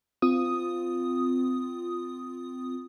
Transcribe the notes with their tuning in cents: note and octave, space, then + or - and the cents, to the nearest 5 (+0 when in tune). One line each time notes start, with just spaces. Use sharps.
C4 -25 F4 +0 D#6 +0